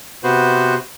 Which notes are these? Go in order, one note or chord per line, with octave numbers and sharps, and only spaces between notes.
C3 B3 F#4 B4 C5